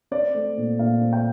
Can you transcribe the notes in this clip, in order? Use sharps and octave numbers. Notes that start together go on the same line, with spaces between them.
C4 D5
A3
A#2
A#2 F5
C4
G5